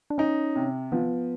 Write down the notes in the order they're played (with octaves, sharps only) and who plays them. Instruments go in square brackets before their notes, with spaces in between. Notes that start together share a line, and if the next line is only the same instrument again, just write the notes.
[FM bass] D4
[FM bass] C#4 [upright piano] D#4
[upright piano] C3
[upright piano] F3 [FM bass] B3